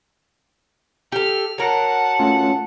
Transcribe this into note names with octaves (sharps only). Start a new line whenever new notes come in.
G4 A4 F6
F#3 A#4 F#5 A5
A3 C#4 F4